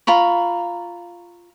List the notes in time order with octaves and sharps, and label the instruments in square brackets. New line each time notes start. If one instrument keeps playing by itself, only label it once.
[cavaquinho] F4 A#5 B5 C#6